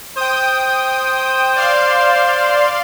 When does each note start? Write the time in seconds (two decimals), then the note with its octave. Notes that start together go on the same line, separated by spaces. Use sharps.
0.17 C5 G5 D#6
1.56 D5 F5 C6